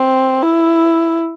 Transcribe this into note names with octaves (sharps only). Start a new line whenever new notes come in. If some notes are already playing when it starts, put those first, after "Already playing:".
Already playing: C4
E4